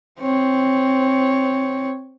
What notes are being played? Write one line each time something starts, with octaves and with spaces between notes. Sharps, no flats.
C4 C#5